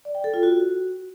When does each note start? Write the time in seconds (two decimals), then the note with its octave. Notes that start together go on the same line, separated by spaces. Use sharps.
0.05 D5
0.15 G5
0.24 A4
0.34 F4
0.43 F#4